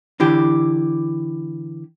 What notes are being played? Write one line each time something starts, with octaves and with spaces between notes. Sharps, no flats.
D3 E3 G4